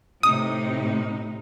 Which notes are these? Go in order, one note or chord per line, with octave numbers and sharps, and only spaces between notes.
A2 C3 D#4 D#6